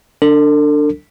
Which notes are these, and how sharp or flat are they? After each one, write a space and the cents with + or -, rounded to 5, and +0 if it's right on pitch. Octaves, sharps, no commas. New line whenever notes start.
D4 +0 A4 +40